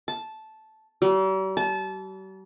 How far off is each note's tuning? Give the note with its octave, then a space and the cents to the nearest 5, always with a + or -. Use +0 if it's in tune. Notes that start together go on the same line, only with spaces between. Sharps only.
A5 -10
G3 -45
A5 -25